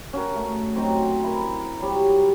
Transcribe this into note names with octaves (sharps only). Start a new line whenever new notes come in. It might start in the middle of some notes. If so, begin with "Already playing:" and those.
C#4 F#4 A#4
A3
F#3 C4 D#4
E4 A#4
F#3 G3 C#5